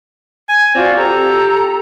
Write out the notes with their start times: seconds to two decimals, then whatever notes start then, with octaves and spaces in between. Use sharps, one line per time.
0.49 G#5
0.74 C4 F4 F#4 D5
0.96 G4 A4 A#5